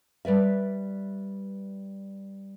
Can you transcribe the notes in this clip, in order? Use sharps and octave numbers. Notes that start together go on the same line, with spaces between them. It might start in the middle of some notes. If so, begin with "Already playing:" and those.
G3 B4 D5 E5